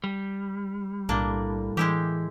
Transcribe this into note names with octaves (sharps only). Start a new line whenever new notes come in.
G3
B1 A2 A#3 D4
E3 G#3 E4 G4